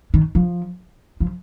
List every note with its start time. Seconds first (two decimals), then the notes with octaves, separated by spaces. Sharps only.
0.14 D#3
0.35 F3
1.20 F3